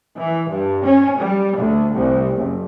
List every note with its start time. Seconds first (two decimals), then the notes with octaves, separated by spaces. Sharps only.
0.16 E3
0.49 G2
0.85 C#4
1.17 G3
1.56 D2
1.93 C2
2.35 F#1